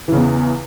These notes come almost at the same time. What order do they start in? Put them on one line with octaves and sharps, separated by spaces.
E3 C#3 E2